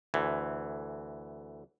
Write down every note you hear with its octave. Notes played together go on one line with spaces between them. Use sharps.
D2 E3